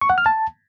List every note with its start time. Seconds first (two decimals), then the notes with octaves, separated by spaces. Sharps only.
0.01 C#6
0.10 F#5
0.18 F6
0.26 A5